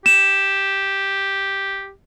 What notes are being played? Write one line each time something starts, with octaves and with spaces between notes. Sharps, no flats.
G4 E7